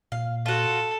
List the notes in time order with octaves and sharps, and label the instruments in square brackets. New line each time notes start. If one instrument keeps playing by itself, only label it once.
[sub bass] A#2 [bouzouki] F5
[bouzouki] F4 F#4 [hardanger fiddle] A4